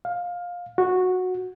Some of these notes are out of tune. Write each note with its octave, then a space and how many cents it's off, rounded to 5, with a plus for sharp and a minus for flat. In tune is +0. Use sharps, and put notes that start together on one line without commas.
F5 +15
F#4 -10